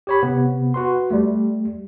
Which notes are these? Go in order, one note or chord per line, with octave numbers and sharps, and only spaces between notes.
G4 C#5 B5
C3 B3
F#4 B4 C6
G3 A3